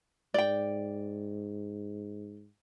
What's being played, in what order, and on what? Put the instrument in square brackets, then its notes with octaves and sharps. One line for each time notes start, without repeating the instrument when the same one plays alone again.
[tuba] G#2 [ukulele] D5 G5